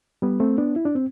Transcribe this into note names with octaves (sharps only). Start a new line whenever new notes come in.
G3 B3
A3 C4
B3 D4
E4
D4
C4